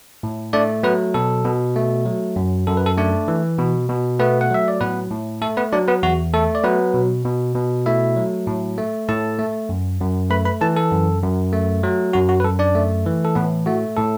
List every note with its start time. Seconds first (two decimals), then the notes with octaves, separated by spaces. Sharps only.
0.23 A2
0.53 A3 D4 D5
0.83 F#3 B3 B4
1.14 B2 A4
1.45 B2
1.76 A3
2.06 F#3
2.36 F#2
2.67 F#2 A4
2.77 B4
2.86 A4
2.98 A3 D4 D5
3.28 E3
3.59 B2
3.89 B2
4.19 A3 B3 B4
4.41 F#5
4.50 F#3 E5
4.68 D5
4.81 A2 B3 B4
5.11 A2
5.42 A3 A4
5.57 B3 B4
5.73 F#3 D4 D5
5.88 B3 B4
6.03 E2 F#4
6.33 A3 A4
6.55 D5
6.64 F#3 B3 B4
6.94 B2
7.25 B2
7.55 B2
7.86 A3 E4 E5
8.17 F#3
8.47 A2
8.78 A3
9.09 A2 A4 A5
9.39 A3
9.69 F#2
10.00 F#2
10.30 A3 B4 B5
10.45 B4 B5
10.61 E3 A4 A5
10.77 A4
10.91 F#2
11.22 F#2
11.53 A3
11.83 F#3
12.13 F#2 F#4
12.29 F#4
12.40 B4
12.44 F#2 A4
12.59 D4 D5
12.75 A3
13.06 E3
13.25 A4
13.35 A2 B3 B4
13.66 A3 F#4
13.97 A2 A4